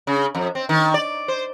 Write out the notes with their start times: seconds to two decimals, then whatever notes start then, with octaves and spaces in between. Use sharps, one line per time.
0.07 C#3
0.35 F2
0.55 C4
0.69 D#3
0.94 D5
1.28 C5